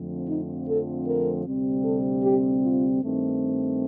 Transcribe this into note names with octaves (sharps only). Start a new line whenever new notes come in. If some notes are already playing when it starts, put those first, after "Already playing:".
Already playing: F2 D3 F3 A3 C4
D#4
A4
A#4
D2 C3 G3 C4
A4
G4
F4
G2 D#3 A3 C4